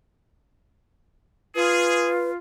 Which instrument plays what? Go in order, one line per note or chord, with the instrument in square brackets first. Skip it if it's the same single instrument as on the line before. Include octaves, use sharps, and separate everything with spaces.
[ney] F4 [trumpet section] G#4 [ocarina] B4